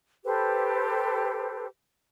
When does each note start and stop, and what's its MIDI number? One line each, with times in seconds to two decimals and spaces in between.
0.25 1.66 67
0.25 1.66 69
0.25 1.66 71
0.25 1.66 72